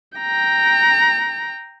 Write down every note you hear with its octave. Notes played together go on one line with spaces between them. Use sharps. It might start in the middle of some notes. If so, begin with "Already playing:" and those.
G5 A#5